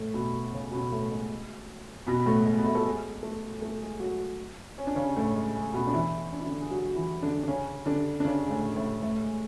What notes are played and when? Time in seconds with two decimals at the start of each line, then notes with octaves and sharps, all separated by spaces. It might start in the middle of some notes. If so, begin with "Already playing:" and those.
Already playing: A2 A3
0.14 B2 B3
0.52 C#3 C#4
0.72 B2 B3
0.92 A2 A3
1.11 G#3
2.07 B2 B3
2.26 A2 A3
2.46 G#3
2.58 B3
2.65 A2 A3
2.75 A4
2.85 G#3 G#4
3.23 A3 A4
3.61 A3 A4
3.81 G#3 G#4
4.00 F#3 F#4
4.78 C#4
4.87 D4
4.95 C#3 C#4
5.16 A2 A3
5.35 G#3
5.55 G#3
5.73 B2 B3
5.87 D4
5.94 E3 E4
6.33 D4
6.40 E4
6.46 D3 D4
6.61 G#4
6.70 F#3 F#4
6.89 F#4
6.96 E3 E4
7.22 D3 D4
7.43 D4
7.48 C#3 C#4
7.86 D3 D4
8.20 D4
8.25 C#3 C#4
8.47 G#3
8.51 A2 A3
8.76 A2 A3
9.02 A2 A3
9.22 G#3